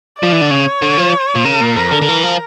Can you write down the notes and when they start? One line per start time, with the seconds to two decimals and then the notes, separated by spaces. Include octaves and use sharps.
0.18 F3 D5
0.32 E3
0.41 D3
0.50 C#3 C#5
0.82 D3
0.98 F3
1.36 A#2
1.45 C#3 A#4
1.61 A#2
1.76 F2 A#4
1.92 D3
2.02 D3
2.09 E3
2.24 F3